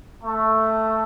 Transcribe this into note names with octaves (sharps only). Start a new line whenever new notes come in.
A3